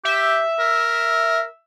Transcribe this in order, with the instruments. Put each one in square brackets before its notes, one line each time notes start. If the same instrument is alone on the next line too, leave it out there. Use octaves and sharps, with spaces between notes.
[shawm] G4 [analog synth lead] E5
[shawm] A#4